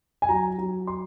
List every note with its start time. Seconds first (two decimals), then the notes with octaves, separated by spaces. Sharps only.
0.22 G#5
0.29 F#3 A#5
0.58 F#3
0.87 C6